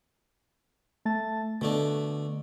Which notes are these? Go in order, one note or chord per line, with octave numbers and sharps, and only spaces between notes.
A3 A5 A6
B2 D3 A3 D4